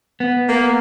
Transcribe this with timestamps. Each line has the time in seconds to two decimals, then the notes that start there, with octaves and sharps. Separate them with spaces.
0.20 B3
0.48 A#3